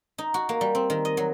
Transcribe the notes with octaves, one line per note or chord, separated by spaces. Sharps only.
D#4
F#4
A#3
G3
C4
D#3
D#5
F#3